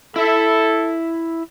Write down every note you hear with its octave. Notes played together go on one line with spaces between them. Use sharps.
E4 A4 E5